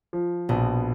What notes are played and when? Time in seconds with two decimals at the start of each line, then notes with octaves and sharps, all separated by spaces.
0.13 F3
0.49 A#1 B2